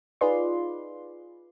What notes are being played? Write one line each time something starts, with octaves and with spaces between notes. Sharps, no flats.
D#4 F4 G#4 B4 D5 C6